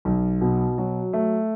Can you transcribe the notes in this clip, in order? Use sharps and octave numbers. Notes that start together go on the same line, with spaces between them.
B1
B2
F#3
A3